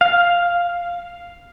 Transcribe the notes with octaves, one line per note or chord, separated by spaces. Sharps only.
F5